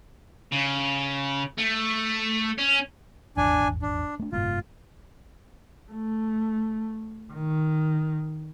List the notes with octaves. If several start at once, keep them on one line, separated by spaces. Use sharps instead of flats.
C#3
A3
C#4
D#1 G#1 E2 D4 G#5
D4
A3 D4
F#1 G#2 B2 F4
A3
D#3